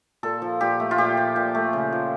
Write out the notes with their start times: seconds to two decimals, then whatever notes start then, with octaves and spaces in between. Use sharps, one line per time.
0.23 A#2 A4
0.42 F3
0.61 A#2 G4
0.80 A3
0.91 F4
0.98 A#2 G4
1.17 F3
1.36 A#2
1.55 A3
1.73 C#3
1.92 F3